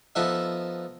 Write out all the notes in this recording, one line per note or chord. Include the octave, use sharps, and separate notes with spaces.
F3 B3 D#4 A4 E5